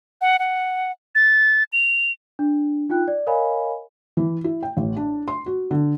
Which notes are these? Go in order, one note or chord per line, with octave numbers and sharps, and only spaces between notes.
F#5
F#5
A6
F7
D4
D#4 F4 G5 F#6
D5
A#4 C#5 D#5 F5 G#5 B5
E3
E4
G5
A1
D4
C6
F#4
D3